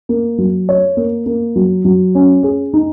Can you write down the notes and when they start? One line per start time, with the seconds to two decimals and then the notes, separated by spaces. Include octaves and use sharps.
0.09 A#3
0.38 F#3
0.69 C#5
0.97 A#3
1.26 A#3
1.56 F#3
1.85 F#3
2.15 C#4
2.43 G#4
2.73 D#4